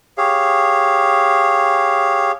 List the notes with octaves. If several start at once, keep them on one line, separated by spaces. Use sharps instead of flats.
G4 G#4 C#5 F5